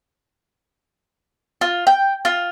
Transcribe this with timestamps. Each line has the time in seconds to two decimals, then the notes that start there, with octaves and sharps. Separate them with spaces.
1.61 F4
1.87 G5
2.25 F4